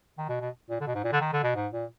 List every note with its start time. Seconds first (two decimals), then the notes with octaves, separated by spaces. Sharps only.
0.18 D#3
0.29 B2
0.41 B2
0.70 A#2
0.81 D3
0.87 B2
0.95 G#2
1.04 A#2
1.12 D3
1.21 D#3
1.33 D3
1.43 B2
1.55 G#2
1.73 A#2